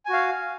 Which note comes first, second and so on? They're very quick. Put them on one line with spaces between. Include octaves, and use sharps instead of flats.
G#5 F#4 F5